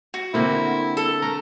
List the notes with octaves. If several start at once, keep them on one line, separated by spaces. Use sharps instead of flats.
F#4
D3 A#3 C4 E4
A4
A3 A#5